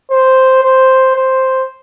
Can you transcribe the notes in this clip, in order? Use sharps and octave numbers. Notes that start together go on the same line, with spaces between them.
C5
C5
C5